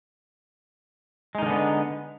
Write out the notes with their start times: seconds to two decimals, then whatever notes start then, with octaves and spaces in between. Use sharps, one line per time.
1.35 G#3
1.38 D#4
1.42 D#3
1.46 D3
1.50 B3